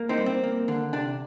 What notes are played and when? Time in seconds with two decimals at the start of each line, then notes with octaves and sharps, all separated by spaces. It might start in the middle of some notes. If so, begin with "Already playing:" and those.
Already playing: A#3
0.09 C4 D#4
0.18 G3
0.26 C4
0.43 A#3
0.68 D3
0.93 C3 D4